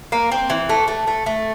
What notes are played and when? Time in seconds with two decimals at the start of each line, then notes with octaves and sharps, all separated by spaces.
0.12 A#3
0.32 C4
0.50 E3
0.69 A3
0.88 A3
1.07 A3
1.26 A3